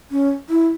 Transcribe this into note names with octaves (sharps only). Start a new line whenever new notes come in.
C#4
E4